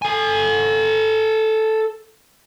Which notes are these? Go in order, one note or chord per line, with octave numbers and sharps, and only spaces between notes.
A4 G#5